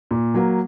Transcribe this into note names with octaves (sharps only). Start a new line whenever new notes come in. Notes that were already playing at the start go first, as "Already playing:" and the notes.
A#2
F#3 A#3